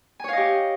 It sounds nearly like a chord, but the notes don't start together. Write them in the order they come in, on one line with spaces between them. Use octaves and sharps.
G#5 C#5 F5 D#5 G4